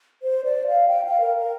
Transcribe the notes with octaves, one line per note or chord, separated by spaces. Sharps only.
C5
D5
F5
G5
F5
A#4
A#4